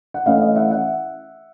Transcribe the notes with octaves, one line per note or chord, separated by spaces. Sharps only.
F#5
E3 A3 C#4 E4 D#5 F5
D#5 F5
E5 F#5
E5 F#5